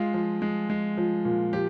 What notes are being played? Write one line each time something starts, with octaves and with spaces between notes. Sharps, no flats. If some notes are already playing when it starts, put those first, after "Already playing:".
Already playing: G#3 F4
F3
G#3
G#3
F3
A#2
F3 G4